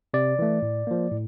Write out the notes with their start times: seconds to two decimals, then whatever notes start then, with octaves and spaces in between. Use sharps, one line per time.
0.14 C3 D5
0.39 E3 A3
0.62 A2
0.87 F3 A#3
1.11 A2